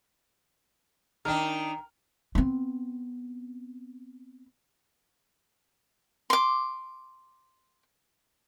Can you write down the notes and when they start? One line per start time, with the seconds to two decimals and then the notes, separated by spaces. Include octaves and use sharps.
1.25 D#3 D4 A#4 G5 F6
2.35 B3 C4
6.30 C6 D6